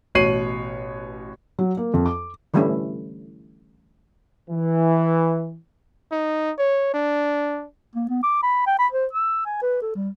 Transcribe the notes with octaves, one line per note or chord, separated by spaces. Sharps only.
A1 B2 C#5 C7 D#7 F#7
F#3
A#3
F2
D6
D3 E3 G3 A3 C#4 E4
E3
D#4
C#5
D4
A#3
B3
D6
B5
G5
B5
C5
E6
G#5
B4
A4
G3